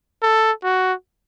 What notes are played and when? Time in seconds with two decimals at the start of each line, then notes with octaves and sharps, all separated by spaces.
0.23 A4
0.64 F#4